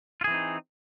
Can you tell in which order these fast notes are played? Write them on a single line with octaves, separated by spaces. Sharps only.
F4 G#4 E3 C4 D#4